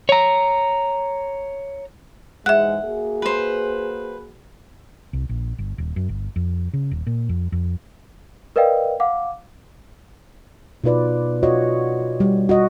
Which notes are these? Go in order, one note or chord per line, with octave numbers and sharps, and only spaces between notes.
C#5 A#5
G#2 E3 G#3 E5 F#5 F#6
A#3 F#4 G#4
B4 C5
C2
A#1
G1
D#1
F#2
G1
F2
C#3
D#1
A#2
F2
F2
A#4 B4 D5 D#5 F5 G5
F5 F#5 D6
B2 D#4 F4 B4 D5
F4 F#4 C#5 D#5
G3
F#4 D#5